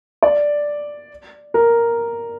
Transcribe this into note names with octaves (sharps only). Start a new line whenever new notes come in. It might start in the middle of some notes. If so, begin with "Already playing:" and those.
D5
A#4